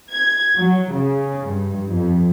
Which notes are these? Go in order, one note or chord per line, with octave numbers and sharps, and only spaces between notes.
G#6
F#3
C#3
G2
F2